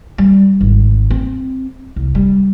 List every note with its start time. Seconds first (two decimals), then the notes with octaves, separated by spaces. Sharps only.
0.18 G3
0.61 G#1
1.10 C4
1.96 C2
2.15 G3